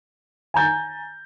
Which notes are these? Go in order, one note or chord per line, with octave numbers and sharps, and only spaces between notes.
G#5 A#5 G6 A6